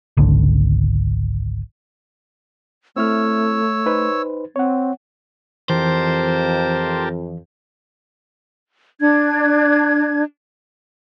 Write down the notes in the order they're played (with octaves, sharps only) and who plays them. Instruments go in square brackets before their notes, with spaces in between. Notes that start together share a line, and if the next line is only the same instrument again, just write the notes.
[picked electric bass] G#1 C#2 D3
[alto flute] A3 [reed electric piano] C4 E4 F6 [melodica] C#5 E6
[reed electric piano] D#4 B4 C5
[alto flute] C4 [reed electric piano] C#5 F#5
[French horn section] F2 [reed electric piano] E3 [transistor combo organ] G4 A#4 A5 [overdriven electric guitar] C5
[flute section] D4 G#6